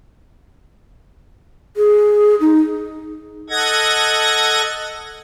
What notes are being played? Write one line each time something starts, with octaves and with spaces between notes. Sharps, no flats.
G#4
D#4
A4 D#5 F#5 G#6 A#6